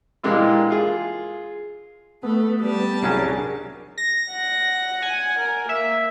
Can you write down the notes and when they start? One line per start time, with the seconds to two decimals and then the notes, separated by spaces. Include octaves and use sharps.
0.24 A#2 E3 G#3 A#3 D4 G4
0.70 F4 G#4
2.23 A3 B3 A4
2.61 G3 A5
3.03 C2 F#3 C#4 D4 G#4 A#4
3.97 A#6
4.31 F#5
5.02 G#5
5.39 A#4
5.69 A#3 E5